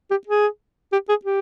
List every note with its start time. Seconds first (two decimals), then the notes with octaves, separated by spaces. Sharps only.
0.11 G4
0.27 G#4
0.92 G4
1.09 G#4
1.25 G4